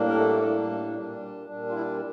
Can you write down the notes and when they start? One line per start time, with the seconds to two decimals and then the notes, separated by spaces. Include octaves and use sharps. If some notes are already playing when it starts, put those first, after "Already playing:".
Already playing: A2 G3 A#3 D4
0.09 A#4
0.16 A3 A4
0.42 A2 G3 A#3 D4
0.95 A#2 G3 D4
1.48 A#2 G3 D4
1.69 F4
1.74 E4